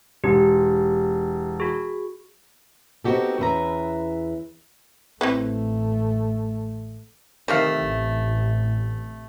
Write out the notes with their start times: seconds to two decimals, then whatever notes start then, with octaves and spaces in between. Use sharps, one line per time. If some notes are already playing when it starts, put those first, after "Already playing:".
0.24 E1 G4
1.60 F#4 G#4
3.04 B3 C4 D#4 F#4 G4 A4
3.39 E2 C#4 B4 E5 A#5
5.21 A1 A3 C4 E4 B4
7.48 C3 D#3 A3 F5
7.84 A1